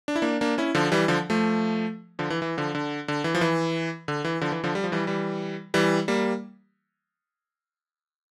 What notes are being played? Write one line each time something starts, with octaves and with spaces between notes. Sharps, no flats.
D4
E4
A#3 D4
A#3 D4
C#4 E4
D3 F3
E3 G3
D3 F3
F3 A3
D3 F3
E3
E3
D3 F3
D3
D3
E3
F3
E3
D3
E3
D3 F3
E3
D3 F3
G3
F3
E3 G3
E3 G3
E3 G3
G3 A#3